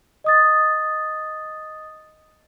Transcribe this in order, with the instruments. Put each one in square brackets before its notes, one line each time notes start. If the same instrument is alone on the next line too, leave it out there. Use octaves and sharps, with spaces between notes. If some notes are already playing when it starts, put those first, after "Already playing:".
[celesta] D#5 D#6 A6